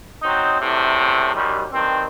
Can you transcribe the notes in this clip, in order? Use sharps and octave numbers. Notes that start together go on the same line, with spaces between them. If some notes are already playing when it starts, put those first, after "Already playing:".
F#3 C4 D#4
E2 A2 C3
F#2 D#3 G3
G2 D#3 C4